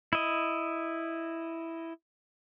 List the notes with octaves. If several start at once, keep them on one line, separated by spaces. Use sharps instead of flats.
E4 D#5